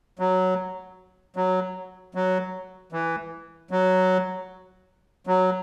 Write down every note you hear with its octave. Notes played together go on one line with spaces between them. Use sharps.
F#3
F#3
F#3
E3
F#3
F#3